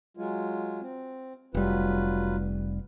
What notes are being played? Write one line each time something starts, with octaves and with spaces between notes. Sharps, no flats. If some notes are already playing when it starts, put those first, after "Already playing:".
F#3 G#3 F4
C4
F1 F#3 G3 F4 B4